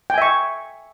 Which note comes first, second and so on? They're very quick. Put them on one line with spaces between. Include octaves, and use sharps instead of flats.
G5 G#5 E5 C#6